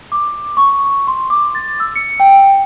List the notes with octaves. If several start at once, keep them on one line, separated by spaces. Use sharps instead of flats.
D6
C#6
C6
D6
A6
E6
C#7
G5